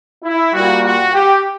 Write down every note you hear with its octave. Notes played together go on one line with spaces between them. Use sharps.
E4
A#2 G3 F#4
F#4
G4